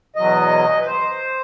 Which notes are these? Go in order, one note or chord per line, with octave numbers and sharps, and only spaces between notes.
E2 B2 F#3 D#5
B4
C5